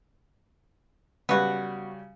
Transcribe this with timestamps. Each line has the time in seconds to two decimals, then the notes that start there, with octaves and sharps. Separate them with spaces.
1.29 C#3 F#3 G3 B3 F#4